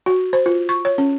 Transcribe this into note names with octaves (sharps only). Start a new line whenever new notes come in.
F#4
C5
F4
C#6
C#5
C#4